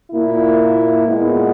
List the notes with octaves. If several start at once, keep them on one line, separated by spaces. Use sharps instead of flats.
A#2 A#3 E4
A#2 G#3 B3